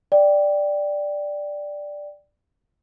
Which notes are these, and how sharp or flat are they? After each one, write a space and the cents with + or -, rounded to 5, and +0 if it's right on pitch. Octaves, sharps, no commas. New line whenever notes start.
D5 +0 G5 +0